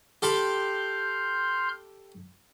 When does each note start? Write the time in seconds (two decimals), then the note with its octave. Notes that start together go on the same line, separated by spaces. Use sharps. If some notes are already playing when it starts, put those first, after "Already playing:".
0.22 G4 A4 B5 C6 F6 G6